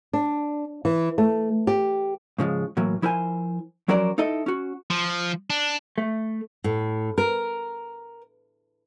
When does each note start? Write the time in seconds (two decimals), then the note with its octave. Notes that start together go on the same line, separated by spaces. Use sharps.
0.13 D4
0.85 E3
1.18 A3
1.67 G4
2.38 G#2 C#3 F3 G#3
2.77 A2 E3 F#3 A#3
3.02 F3 E4 A#4 C5 G#5
3.88 F3 F#3 C#4 A#4 C5 D5
4.18 D#4 E4 A4 D#5
4.46 C#4 F#4
4.90 F3
5.50 D4
5.98 A3
6.64 A2
7.18 A#4